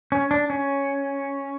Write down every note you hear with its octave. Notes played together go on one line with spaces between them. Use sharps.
C#4
D4
C#4